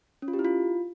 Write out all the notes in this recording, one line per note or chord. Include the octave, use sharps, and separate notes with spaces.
C#4
F4
G4
E4
F4